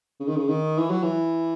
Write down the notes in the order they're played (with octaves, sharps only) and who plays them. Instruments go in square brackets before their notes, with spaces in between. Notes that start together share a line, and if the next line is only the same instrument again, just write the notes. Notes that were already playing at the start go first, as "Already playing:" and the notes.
[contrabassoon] C#3
D#3
C#3
D#3
E3
F#3
E3